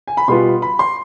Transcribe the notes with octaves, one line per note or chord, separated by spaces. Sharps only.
G#5
B5
B2 G3 B3 F4 C6
B5
C6